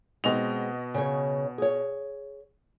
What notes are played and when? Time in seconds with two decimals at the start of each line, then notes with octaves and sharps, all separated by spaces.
0.24 B2 G#3 C4 D#5 F7
0.94 C#3 C#5
1.58 G#4 C#5